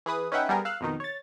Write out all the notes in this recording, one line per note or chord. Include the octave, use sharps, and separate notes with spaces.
E3 G#4 B4 D#6
C#4 D#4 B4 E5 F#5 G5
G3 B3 G#4 A#4
F5 E6 F#6
F2 B2 D#3 D#4
C#5 A6